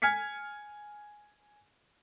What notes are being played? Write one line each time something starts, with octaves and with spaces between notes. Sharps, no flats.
G#5 F6 G#6 B6 C#7